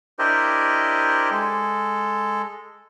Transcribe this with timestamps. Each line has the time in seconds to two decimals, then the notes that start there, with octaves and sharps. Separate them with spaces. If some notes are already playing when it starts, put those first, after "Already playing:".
0.19 D4 E4 G4 A#4 C5 D#5
1.31 G#3 A4